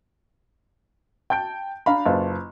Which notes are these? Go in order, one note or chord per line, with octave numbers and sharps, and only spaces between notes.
G5 A5 G6 D7
D4 F5 A#5 B5
F#1 F4 B4 A5